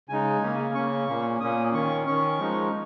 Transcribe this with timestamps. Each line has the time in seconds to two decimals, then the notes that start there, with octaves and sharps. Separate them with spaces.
0.09 C#3 G#3 D#4 G#5
0.42 C#3 A#3 C#4
0.75 C#3 A#3 C#4 C#6
1.08 A#2 A#3 C#4
1.40 A#2 A#3 C#4 D#6
1.73 D#3 C#4 C#6
2.07 D#3 C#4 C#6
2.39 F3 G#3 D#4